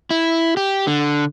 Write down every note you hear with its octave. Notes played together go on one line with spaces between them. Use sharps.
E4
G4
D3